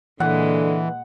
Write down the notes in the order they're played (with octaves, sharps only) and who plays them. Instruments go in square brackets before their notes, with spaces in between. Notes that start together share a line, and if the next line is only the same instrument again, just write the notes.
[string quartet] A#2 G#3 [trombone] D3 [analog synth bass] E3 [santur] F#5